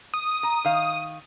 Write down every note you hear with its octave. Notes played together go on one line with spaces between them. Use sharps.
D#6
A#5
D#3 F5